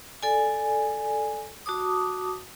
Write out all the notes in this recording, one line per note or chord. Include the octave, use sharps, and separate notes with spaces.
A4 D5 G#5
F#4 A5 D6 D#6